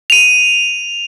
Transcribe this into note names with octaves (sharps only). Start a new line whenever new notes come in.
D#7 F7